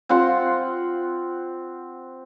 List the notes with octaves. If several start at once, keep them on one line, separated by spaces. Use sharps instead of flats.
C4 F4 F#5 C6